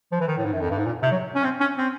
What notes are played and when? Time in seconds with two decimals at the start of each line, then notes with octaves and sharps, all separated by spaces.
0.12 F3
0.21 E3
0.28 D#3
0.37 A2
0.45 G#2
0.53 F#2
0.61 F2
0.70 G2
0.78 G#2
0.86 A#2
1.03 C3
1.11 F#3
1.35 C#4
1.44 C4
1.61 C#4
1.78 C4